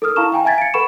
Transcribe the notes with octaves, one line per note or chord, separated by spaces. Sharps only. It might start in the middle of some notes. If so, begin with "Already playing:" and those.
A4 A#4 D#6 F6
E4 F5 A5 A#5 C#6 E7
F5 G5 G#5 A#5
E5 F5 G#5 G#6 A6 B6
C#7 D7
A4 B4 F#5 B5 C#6 E7